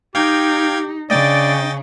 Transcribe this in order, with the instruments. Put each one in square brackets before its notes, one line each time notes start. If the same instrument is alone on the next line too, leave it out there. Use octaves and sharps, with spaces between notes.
[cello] D#4 [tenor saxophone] G4 [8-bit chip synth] F5 G5 G#6
[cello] C#3 D4 [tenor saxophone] D5 [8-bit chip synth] D#5 G5 A6